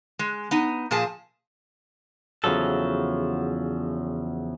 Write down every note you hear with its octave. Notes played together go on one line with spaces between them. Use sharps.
G#3
B3 D#4
A#2 F3 G#4 A5
E2 C#3 F3 F#3 A4